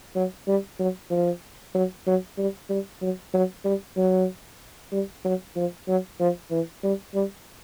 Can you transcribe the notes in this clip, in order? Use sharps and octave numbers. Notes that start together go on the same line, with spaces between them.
F#3
G3
F#3
F3
F#3
F#3
G3
G3
F#3
F#3
G3
F#3
G3
F#3
F3
F#3
F3
E3
G3
G3